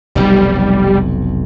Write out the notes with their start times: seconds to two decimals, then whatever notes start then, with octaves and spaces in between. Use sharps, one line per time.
0.15 F1 B1 F2 G3